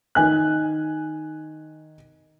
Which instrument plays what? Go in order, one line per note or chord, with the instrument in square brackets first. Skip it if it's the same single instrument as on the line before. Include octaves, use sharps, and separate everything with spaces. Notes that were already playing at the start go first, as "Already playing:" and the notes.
[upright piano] D#3 G#5 F#6